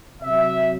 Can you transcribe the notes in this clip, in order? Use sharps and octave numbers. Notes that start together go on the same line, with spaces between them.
C3 F#3 E5